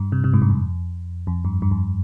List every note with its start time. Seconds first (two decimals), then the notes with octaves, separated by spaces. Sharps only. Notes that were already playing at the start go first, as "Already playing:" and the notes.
Already playing: G2
0.12 C3
0.24 C3
0.34 G#2
0.42 G2
0.50 F2
1.27 F2
1.45 G2
1.62 G2
1.71 F2